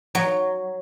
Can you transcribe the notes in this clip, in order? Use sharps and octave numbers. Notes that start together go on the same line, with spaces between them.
F#3